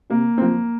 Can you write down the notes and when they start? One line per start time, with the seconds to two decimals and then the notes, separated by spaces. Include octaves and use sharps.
0.10 C3 A#3
0.38 C4
0.41 F3 A#3